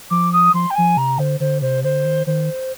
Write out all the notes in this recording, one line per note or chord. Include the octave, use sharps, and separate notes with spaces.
F3 D6
D#6
F3 C6
G5
F3 G#5
C3 A#5
D3 C5
D3 C5
C3 C5
D3 C5
D#3
D#3 C5